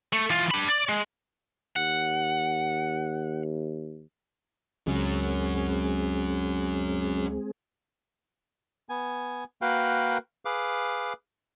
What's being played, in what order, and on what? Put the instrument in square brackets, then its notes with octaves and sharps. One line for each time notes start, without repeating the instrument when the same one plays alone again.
[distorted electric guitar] A3
E3 F4
D4 B5
D5
G#3
[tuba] D#2 [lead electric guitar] F#5
[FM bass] C#2 [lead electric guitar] F#3 C#4 [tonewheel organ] G#3 C4 G#4
[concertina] B3 G#5
A#3 F#4 A#4 B4 F5 G5
G#4 B4 F5 D6